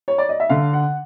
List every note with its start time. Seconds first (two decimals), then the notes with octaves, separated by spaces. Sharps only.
0.08 C#5
0.18 D5
0.29 D#5
0.40 E5
0.49 D3 F5
0.73 F#5